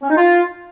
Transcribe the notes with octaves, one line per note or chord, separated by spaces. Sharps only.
C#4
D#4
F4